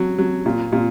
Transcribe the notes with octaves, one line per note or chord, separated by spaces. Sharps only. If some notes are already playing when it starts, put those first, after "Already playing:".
Already playing: F#3
F#3
A#2
A#2